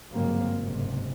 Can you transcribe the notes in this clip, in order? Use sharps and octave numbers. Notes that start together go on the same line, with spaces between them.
G1 G#2 C#3 F#3 A#3 C4
F#1 D2 G#2 C3